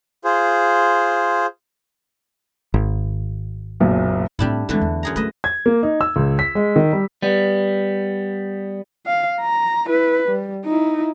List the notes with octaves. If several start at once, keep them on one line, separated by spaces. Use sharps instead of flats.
F4 G#4 C5
G#1
F#1 B1 A#2
A2 G3 C4 D4 E4
D3 E3 G#3 A3 C4
E2
F#2 G#4 A#5
A3 B4 D#5 E5
G#6
A#3
D#4
E6
C#2
B6
G#3
D#3
G3
G3 B3
F5
A#5
E4 B4
G3
D#4 E4